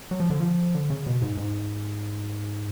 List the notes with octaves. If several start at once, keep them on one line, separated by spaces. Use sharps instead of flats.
F#3
F3
D3
F3
D3
C#3
B2
G#2
G#2